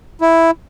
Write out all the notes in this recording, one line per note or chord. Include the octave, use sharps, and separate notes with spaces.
E4